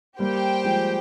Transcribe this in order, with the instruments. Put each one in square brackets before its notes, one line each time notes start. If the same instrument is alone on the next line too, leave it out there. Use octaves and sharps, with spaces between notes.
[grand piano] G3 A#3 [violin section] G4 C5 G5
[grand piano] F3 G#3